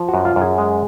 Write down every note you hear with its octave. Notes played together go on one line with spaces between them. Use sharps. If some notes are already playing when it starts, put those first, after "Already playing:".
Already playing: F3
F#4
F#2
F4
F#2
G#4
G#3